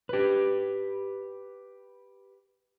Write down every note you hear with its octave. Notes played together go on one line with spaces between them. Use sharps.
G4 B4